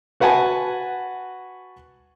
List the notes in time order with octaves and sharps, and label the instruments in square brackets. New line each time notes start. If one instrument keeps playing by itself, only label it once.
[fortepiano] F#4 B4 F#5 G#5 A5